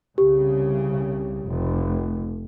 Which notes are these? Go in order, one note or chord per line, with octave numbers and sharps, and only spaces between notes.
C2 C#3 G4
F1